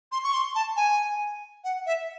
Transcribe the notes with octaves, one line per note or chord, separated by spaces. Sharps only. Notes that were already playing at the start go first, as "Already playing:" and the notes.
C6
C#6
C6
A5
G#5
F#5
E5